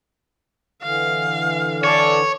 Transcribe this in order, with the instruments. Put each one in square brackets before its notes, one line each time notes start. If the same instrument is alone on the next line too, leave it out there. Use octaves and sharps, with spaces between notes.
[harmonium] D3 E3 [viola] F5
[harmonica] A4 D5 [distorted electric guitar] C#5